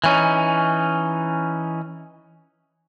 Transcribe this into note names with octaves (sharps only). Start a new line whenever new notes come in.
E3 C#4 D#4